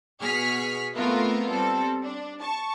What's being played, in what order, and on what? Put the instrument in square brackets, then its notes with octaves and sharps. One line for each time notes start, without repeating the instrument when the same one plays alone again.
[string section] B2 G#4 C#6 F6 B6
A3 B3 C4 E4 F4 A#4
G3 C4 A4
D4
A5 C#6